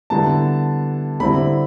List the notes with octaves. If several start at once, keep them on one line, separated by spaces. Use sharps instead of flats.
D3 G3 B3 E4 A5
D3 G3 C4 E4 B5